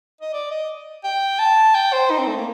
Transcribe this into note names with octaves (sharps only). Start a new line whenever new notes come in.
D#5
D5
D#5
G5
A5
G5
C5
D#4
C4
A3
A#3